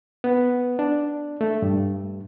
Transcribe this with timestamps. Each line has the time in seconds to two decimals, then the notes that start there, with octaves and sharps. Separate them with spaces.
0.24 B3
0.79 D4
1.41 A3
1.62 G2